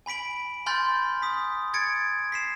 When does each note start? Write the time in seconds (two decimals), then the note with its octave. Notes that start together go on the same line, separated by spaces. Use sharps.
0.06 G#5 B5 B6 D7 F#7
0.66 G#5 B5 C6 F6 G6 A6
1.22 D#6 B6
1.74 G#6 A6 C#7 D7
2.32 B6 C7 E7